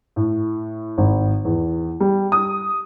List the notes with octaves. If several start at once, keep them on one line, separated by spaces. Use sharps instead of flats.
A2
G#1
E2
G3
D#6